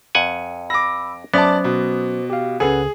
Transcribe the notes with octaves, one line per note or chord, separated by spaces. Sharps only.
F2 F#5 G#5
B5 D6 E6 A#6
F#3 B3 C#4 C5 D5 E5 A5 D6
B2
G4 F5
C#2 C#4 G#4 A4 B4 F#5 G#5